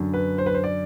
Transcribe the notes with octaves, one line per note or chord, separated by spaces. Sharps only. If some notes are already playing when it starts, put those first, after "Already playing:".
Already playing: F#2 D3
B4
C5
B4
C5
D5